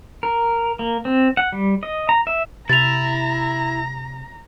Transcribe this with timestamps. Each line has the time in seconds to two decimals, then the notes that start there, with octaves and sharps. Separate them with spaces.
0.23 A#4
0.79 A#3
1.05 C4
1.37 F#5
1.52 G3
1.83 D#5
2.09 A#5
2.27 E5
2.69 C3 E4 A#5 A6 F7